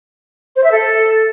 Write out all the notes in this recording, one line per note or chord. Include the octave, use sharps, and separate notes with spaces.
C5
E5
A4